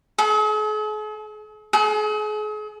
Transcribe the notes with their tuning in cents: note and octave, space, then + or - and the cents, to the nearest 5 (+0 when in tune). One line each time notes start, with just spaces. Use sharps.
G#4 +45
G#4 +40